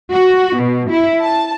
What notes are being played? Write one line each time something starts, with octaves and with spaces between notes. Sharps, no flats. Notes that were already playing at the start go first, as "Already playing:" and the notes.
F#4
B2
E4
A5